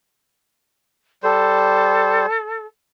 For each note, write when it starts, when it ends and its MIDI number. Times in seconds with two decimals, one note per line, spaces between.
1.23 2.26 55
1.23 2.66 69
1.23 2.26 72